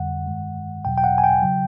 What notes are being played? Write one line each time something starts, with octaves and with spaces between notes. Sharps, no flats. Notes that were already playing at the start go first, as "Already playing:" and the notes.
Already playing: F2 D3 G3 F#5
G2 D#3 G#3
E2 B2 F#3 G5
G5
F#5
G#5
G5
C#3 F#3